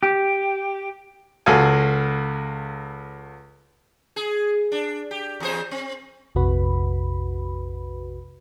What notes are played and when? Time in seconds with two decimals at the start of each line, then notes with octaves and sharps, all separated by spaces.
0.03 G4
1.46 C#2 F#4 A4 F5 G#5
4.16 G#4
4.72 D4
5.11 G4
5.40 E2 G#4 C5
5.71 C4
6.35 A#1 F2 C3 F#4 B4 B5